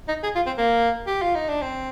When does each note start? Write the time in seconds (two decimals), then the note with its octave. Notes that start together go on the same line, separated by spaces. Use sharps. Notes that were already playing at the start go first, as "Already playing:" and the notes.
0.08 D#4
0.23 G#4
0.35 F4
0.46 C4
0.57 A#3
1.07 G4
1.22 F4
1.35 D#4
1.49 D4
1.62 C4